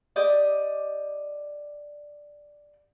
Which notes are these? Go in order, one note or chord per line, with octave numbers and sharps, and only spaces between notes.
G4 D5 D#5